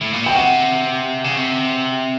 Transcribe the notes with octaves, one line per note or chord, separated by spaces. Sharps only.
A2
A#2
B2 G5
C3 F#5
C#3
C3